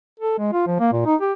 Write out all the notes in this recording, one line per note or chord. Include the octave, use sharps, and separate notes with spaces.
A4
G#3
F4
F3
A#3
A#2
D#4
G4